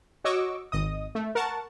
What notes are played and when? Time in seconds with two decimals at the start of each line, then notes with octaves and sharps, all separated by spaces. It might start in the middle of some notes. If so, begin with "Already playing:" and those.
0.24 F#4 C#5 D#5 C#6 D6 E6
0.72 G#1 D#5 D#6
1.15 A3
1.35 A#4 F#5 A5 C#6